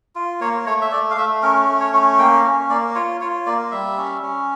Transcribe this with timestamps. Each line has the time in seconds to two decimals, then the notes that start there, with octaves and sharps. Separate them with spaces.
0.15 F4
0.41 A#3 C#5
0.66 A3 C#5
0.82 E5
0.92 A3 D5
1.11 F5
1.17 A3 E5
1.43 C#4 A#4
1.68 A3
1.80 C#5
1.93 C#4
2.19 A#3 G5
2.44 C#4
2.70 A#3 D5
2.95 F4 C#5
3.21 F4 C#5
3.46 A#3 D5
3.71 G3 E5
3.97 C#4
4.22 C#4